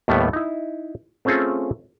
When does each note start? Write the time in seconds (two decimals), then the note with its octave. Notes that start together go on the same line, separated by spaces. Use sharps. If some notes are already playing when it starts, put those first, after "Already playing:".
0.08 D#2 A2 G3 A3 B3
0.33 D#4 E4
1.25 A3 C4 C#4 F4 G#4 A4